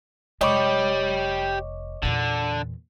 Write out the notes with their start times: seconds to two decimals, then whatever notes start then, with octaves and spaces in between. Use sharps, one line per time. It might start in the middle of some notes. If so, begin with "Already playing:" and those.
0.41 F1 G#3 G4 C#5 D#5 B5 D6
2.03 E2 A#2 D3